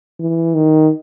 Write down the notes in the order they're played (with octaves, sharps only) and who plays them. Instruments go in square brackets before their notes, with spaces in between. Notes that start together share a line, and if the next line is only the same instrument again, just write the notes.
[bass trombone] E3
D#3